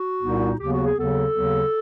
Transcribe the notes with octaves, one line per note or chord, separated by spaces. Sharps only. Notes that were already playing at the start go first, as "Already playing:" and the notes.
Already playing: F#4
C2 A#2 G3 B3 D#4
D#2 C#3 F#3 B3 G4
F#4
G#4
D#2 C#3 F#3 B3 A4
D#2 C#3 F#3 B3